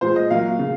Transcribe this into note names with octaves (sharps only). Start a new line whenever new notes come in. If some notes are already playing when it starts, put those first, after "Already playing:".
A#2 F3 G#3 C5
D#5
A#2 F#3 A#3 F5
C#3